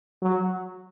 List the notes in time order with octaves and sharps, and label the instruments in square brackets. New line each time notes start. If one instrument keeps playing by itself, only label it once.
[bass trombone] F#3